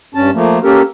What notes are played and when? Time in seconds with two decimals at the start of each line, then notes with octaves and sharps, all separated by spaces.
0.15 G2 C#4 A5
0.34 F3 A3 A#3
0.64 A#3 C#4 G4 A4 A#4